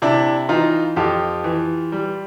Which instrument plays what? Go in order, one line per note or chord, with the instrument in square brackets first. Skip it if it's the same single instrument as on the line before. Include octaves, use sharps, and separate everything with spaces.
[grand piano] C3 D4 E4
E3 D#4 F4
F2 F4 G4
E3
G3